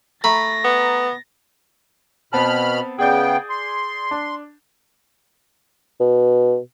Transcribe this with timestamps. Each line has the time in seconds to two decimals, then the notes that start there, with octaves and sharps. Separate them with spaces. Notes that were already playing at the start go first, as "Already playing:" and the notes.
0.24 A3 A#5 B5 A6 A#6
0.64 B3
2.33 B2 B3 C4 A5 B5 F6
2.99 C#3 B3 G#4 D5 G5 G6
3.50 C6
4.11 D4
6.00 B2